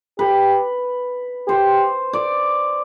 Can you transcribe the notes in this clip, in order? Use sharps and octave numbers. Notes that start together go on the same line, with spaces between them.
G4 B4
G4 C5
D5